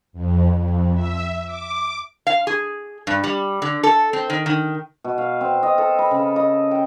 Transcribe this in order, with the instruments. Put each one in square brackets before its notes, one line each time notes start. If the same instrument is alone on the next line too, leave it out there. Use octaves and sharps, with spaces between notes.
[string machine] F2
F2
E5
D6
[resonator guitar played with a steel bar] F5
G#4
G2
G3
D3
A4
C4
D#3
D#3
[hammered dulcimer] B2
F5
C4
D#5
A4
B5
C#3
D#5
G5